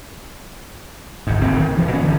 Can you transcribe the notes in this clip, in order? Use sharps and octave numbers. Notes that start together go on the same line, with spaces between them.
G#1 G#2
F1 D#2 C#3 C4
D#3
D#1 E3 F3
A#2 C#4
G1 D3